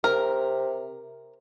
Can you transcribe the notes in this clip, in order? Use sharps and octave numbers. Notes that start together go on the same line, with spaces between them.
C3 A#4